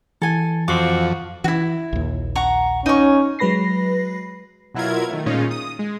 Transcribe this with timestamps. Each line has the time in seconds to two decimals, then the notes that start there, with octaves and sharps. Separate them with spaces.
0.22 E3 A4 G#5
0.68 F2 C4 F#4 D6
1.44 E3 E4 F#4
1.93 A#1 D#2
2.36 F#5 A#5 C#6
2.86 C#4 D#4 C#6
3.39 F#3 G#3 B4 B5 A#6 C7
4.74 B2 F#3 E4 F4 A#4 G#6
5.10 D#3 A3
5.26 A#2 G#3 C#4 D#4 F4
5.51 D#6
5.79 G#3